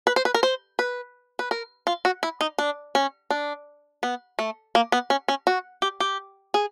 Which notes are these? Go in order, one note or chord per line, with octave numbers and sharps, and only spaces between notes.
B4
C5
B4
A#4
C5
B4
B4
A#4
F4
F#4
E4
D#4
D4
C#4
D4
B3
A3
A#3
B3
C#4
C#4
F#4
G4
G4
G#4